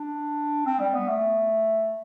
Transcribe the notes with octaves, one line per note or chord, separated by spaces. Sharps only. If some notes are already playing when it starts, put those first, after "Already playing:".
Already playing: D4
C4
G3
B3
A3